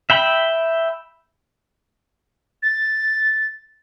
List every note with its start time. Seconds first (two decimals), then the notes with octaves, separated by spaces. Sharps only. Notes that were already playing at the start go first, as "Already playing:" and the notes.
0.10 E5 G5 B5
2.63 A6